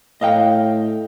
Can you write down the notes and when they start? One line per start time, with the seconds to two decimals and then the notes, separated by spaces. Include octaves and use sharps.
0.21 A2 D#5 F5 G5